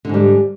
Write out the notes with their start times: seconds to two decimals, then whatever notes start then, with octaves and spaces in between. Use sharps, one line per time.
0.05 D3
0.09 G#2
0.14 G3